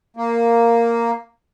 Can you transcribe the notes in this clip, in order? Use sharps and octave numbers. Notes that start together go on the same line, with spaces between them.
A#3